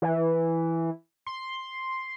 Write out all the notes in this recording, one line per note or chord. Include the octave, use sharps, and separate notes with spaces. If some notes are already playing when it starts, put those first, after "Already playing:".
E3
C6